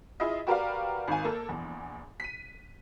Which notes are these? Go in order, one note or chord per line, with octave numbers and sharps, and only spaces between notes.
E4 F4 G#4 D#5
F#4 G4 A#4 B4 D5 F5
G#1 D#3 F5 G#5
A#3 A4
A#1 E2
B6 D#7